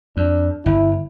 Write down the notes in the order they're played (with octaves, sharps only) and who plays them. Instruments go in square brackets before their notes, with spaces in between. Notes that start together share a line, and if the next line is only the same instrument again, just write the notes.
[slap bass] F2 [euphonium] D4
[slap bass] G1 [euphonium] E4